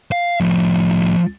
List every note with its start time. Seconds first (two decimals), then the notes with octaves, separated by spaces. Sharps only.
0.12 F5
0.40 A2 F3